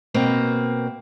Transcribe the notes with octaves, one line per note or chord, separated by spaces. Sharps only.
B2 A#3 C4